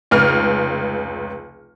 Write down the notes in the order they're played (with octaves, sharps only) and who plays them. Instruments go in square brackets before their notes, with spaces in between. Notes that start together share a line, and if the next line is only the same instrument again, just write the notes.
[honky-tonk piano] F1 C#2 F6